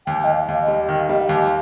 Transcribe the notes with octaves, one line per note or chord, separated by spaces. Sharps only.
D#2 G5
D#2 D#5
F5
D#2
D#5
G3
D#3 G5
F5
G3 D#5
G5
D#2 F5